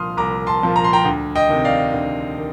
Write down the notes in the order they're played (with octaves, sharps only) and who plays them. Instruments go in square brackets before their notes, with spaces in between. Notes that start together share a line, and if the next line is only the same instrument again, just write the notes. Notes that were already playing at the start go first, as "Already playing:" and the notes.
Already playing: [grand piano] C2 A#2 F3 C6 D#6 F6
C2 A#5 D6
A5 C6
A#2 F3
A#5
C6
G5 A#5
D2
D#5 G5
C3 D#3
D5 F5
D2
D#3